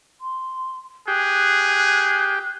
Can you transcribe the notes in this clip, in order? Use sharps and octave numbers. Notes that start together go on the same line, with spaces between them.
C6
G4 G#4 F#6